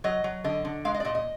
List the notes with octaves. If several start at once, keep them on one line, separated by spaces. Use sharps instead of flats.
F#3 D#5
F#3
D3 D#5
D3
G#3 F5
D#5
D5
A#2 D#5
D#5